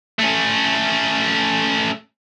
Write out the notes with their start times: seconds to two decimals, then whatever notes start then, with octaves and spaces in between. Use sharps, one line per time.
0.19 A3 C#4